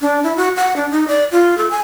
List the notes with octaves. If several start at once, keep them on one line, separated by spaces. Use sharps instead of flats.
D4
E4
F#4
F#5
D4
D#4
D5
F4
A4
G#5